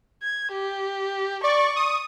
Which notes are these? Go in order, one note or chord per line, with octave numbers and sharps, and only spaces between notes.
G#6
G4
D5 C#6
D#6